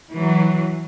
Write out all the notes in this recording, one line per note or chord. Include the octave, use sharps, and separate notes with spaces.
E3 F#3